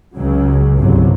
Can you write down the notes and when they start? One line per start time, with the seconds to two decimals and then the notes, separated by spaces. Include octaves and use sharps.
0.17 C#2 C#3 F#3
0.78 G1 C2 G2 C3 F#3